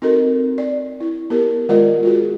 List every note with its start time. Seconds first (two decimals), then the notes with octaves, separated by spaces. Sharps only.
0.02 C4 D#4 F#4 A4 A#4 D#5
0.58 D5
1.00 E4
1.30 B3 G4 A#4
1.69 D#3 G#3 F4 A#4 D5 D#5
2.03 F4 F#4 G#4